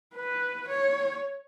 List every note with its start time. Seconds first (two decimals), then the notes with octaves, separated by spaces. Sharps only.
0.15 B4
0.68 C#5